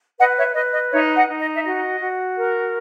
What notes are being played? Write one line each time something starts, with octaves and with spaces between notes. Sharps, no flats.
B4 D#5 F#5
C#5 E5
B4 D#5
D#5
D#4 C#5 E5
D#5 F#5
D#4
D#5
E5
F#4 D#5
F#4
A#4